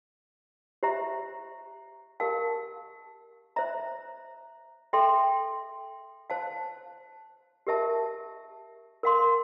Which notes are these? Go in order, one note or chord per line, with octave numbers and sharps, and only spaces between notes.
G4 C5 E5 A#5
G4 A#4 F5 A5
C5 E5 A#5
A4 E5 G5 C6
C5 F5 A5
G4 A#4 E5 A5
A#4 F5 C6